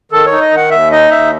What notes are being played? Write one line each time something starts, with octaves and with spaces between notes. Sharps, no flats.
D#3 A4
C#5
D#4
D#5
D#3 F#5
D#2 E5
D#4 D#5
D#2 E5